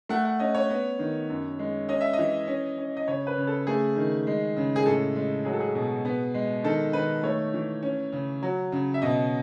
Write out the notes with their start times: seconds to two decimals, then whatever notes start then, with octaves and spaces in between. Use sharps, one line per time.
0.09 A3 F#5
0.25 F#5
0.40 C#4 D#5
0.55 C#5
0.70 B3
0.99 D#3
1.30 F#2
1.59 G#3
1.89 C#4 D#5
2.01 E5
2.13 D#5
2.19 E3
2.48 C#4
2.78 C#4
2.97 D#5
3.08 C#3 C#5
3.27 B4
3.37 C#3
3.47 A4
3.67 A3 G#4
3.96 D#3
4.27 G#3
4.57 C#3
4.76 G#4
4.86 A2 A4
5.16 G#3
5.45 F#3 G#4
5.53 A4
5.60 G#4
5.75 B2
6.05 B3
6.34 G#3
6.64 D#3 A4
6.93 D#3 B4
7.23 A3 C#5
7.54 E3
7.83 C#4
8.12 C#3
8.42 F#3
8.72 C#3
8.94 E5
9.02 B2 D#5